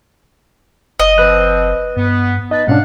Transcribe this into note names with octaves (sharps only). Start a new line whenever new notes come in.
F#1 D#5
F3 C4 B4 F#6
G2 B3
D#4 B4 D#5 A5
G#2 B2 C#4 D4 F5 F#5